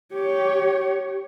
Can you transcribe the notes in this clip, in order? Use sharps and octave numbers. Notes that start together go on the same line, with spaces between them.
G4 C#5